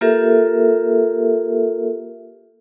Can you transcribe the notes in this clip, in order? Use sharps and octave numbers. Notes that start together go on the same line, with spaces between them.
A#3 F4 G4 A4 A#4 E5